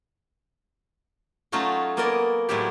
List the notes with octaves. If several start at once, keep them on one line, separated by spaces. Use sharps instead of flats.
F#3 A3 C#4 D#4 F4 F#4
A#3 B3 A#4 D5 D#5 G#5
A2 F#3 G#3 E4 F4 G4